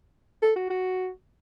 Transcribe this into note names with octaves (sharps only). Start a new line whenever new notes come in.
A4
F#4
F#4